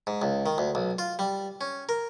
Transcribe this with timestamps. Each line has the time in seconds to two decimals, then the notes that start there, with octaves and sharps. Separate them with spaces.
0.07 G#2
0.22 C#2
0.46 D#3
0.58 D2
0.75 B1
0.99 F4
1.19 G3
1.61 C#4
1.89 A#4